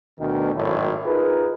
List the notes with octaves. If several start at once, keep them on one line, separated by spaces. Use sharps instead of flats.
D2 B2 D#3
G#1 F#2 A2
D#4 F4 G#4 A#4 B4